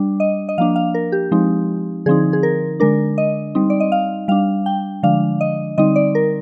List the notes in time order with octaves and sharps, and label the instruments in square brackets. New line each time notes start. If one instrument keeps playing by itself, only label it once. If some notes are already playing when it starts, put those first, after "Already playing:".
Already playing: [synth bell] G3 D4
D#5
D#5
F3 A#3 D4 F5
F5
A#4
G4
F3 G#3 C4 D#4
D3 F3 C4 D#4 G#4
G#4
A#4
D3 G#3 D4 A#4
D#5
G3 C4 D#4
D5
D#5
F5
G3 D4 F5
G5
D3 F3 G#3 D4 F5
D#5
D3 G3 C4 D#4 D#5
D5
A#4